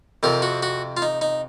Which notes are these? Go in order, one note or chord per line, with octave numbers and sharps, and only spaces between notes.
F2 C3 F3 A#4
F#4
F#4
F4
D#4
D#4